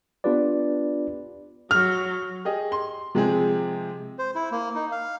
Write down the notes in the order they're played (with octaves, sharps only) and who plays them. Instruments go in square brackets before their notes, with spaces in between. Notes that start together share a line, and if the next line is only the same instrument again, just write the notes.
[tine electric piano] B3 D4 F4 G4 B4 D5
[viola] F#3 [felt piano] F6
[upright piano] G4 G#4 D#5
C6
C3 F3 G#3 C4 G4 G#4
[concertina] C5
E4
A#3
D#4
F5